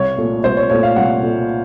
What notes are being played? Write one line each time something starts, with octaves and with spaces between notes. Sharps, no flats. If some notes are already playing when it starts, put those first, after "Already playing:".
Already playing: C2 C#5
A#2 A3
C2 C5
C#5
A#2 A3 C#5
F5
C2 F#5
A#2 A3